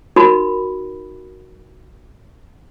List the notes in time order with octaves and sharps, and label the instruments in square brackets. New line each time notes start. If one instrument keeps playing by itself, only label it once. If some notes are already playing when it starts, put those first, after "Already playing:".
[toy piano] D#4 F#4 A#4 B5